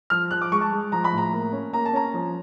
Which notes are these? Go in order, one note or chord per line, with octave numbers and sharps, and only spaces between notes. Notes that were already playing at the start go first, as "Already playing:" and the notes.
F3 F6
F3 F#6
D6
G#3 C#6
A5
G#3
F3 A#5
B5
A2
A#5
A#3
C#4
A#3 A#5
A5
C#4 A#5
F3